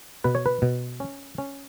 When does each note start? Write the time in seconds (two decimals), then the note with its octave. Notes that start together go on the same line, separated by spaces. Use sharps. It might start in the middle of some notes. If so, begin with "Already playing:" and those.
0.24 B2 B4
0.35 C#5
0.46 B4
0.62 B2
1.00 C#4
1.38 C#4